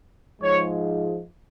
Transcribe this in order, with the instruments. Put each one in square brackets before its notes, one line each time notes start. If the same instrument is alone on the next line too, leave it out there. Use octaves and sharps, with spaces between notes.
[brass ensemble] G#2 F3 G#3 C#5